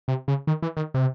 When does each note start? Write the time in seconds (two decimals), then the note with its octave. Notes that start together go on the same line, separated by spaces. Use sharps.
0.08 C3
0.28 C#3
0.47 D#3
0.62 E3
0.77 D#3
0.94 C3